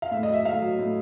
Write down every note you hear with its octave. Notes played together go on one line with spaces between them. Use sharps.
F5
A2 E5
D#5
F#3
E5
A2 F5
F#3
A2